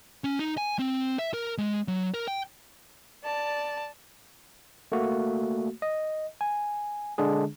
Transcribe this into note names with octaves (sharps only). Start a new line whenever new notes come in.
C#4
D#4
G#5
C4
E5
A#4
G#3
F#3
A#4
G5
D5 A5
A3 A#3 F#4
D#5
G#5
D3 G#3 D4 G#4